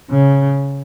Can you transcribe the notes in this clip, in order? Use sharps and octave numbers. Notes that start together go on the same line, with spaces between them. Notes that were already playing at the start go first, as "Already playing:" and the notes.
C#3